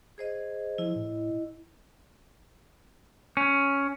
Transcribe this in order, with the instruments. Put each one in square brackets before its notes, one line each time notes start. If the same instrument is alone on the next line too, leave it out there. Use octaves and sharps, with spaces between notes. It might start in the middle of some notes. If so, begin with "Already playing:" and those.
[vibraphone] G#4 C5 D#5
[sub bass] F3 [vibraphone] E4 D#5
[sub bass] A2
[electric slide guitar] C#4